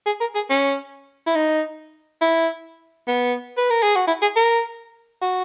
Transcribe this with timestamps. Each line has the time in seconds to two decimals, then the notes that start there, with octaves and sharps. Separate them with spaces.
0.06 G#4
0.20 A#4
0.35 G#4
0.50 C#4
1.27 E4
1.36 D#4
2.21 E4
3.08 B3
3.57 B4
3.71 A#4
3.83 G#4
3.96 F#4
4.08 E4
4.22 G#4
4.36 A#4
5.22 F#4